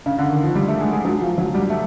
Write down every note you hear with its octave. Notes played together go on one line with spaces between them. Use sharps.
C#3
D3
D#3
F3
G3
A3
G#3
G#3
F#3
F3
F#3
G3
A3